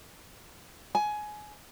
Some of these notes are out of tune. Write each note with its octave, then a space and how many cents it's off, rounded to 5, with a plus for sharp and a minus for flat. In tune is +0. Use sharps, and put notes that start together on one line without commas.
G#5 +20